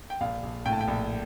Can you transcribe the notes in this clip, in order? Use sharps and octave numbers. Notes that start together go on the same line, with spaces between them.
G5
A#1 F5
A#1
A2 G5
A5
G5
A#1